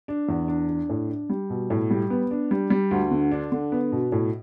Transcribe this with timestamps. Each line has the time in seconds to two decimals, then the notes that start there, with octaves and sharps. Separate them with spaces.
0.08 D4
0.29 E2
0.48 D4
0.69 D4
0.89 A2
1.09 D4
1.29 G3
1.50 B2
1.70 A2
1.90 G3
2.10 B3
2.31 D4
2.51 G3
2.70 G3
2.91 D2
3.11 D3
3.31 D4
3.52 D3
3.72 B3
3.92 B2
4.12 A2